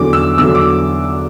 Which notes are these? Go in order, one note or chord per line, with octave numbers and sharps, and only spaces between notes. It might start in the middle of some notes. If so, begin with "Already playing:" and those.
Already playing: E2 D3 F#3 D6
E6
E2 D3 F#3 E6
D6